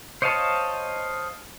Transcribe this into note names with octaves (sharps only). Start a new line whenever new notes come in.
C5 C#5 D#5 F5 A5